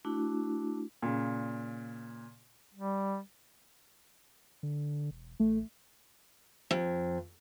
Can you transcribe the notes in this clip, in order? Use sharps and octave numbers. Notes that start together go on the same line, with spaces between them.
A3 D4 E4 F#4
A#2 C#3
G3
D3
E1
A1 A3
F2